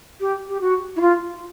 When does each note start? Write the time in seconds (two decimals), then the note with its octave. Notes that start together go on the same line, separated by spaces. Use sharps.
0.20 G4
0.49 G4
0.61 F#4
0.96 E4
1.01 F4